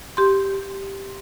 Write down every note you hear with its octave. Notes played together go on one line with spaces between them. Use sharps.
G4 C6